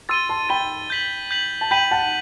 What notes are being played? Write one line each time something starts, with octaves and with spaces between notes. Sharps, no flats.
C6 E6 A6 D#7 G7
A5 C6
G5 B5 A6 D#7 G7
G6 B6 F#7
G6 B6 F#7
A5
G5 B5 G6 B6 D#7 F#7
F#5 A5